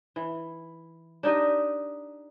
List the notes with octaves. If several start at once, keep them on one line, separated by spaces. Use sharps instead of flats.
E3
D4 D#4 G4 D#5